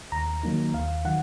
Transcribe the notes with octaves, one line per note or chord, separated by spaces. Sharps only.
D#2 A#5
D#3 F#3 A#3 D#4
D#2 F5
D#3 F#3 F#5